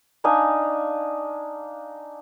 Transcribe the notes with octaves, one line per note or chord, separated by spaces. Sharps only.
D4 D#4 F5 G#5